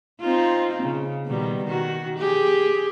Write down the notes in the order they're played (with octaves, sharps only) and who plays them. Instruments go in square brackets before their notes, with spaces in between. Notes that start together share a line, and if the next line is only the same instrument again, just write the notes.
[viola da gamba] C4 D#4 F4
C#3
B2 D#3 G3
D#3 F#4
G4 G#4